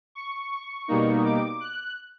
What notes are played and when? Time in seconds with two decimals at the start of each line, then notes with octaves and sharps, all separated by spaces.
0.15 C#6
0.52 C#6
0.88 B2 G3 A#3 D#4
1.24 D6
1.61 F#6